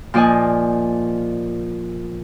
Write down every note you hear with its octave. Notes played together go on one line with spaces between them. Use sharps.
A#2 F3 D5 D#5 G#5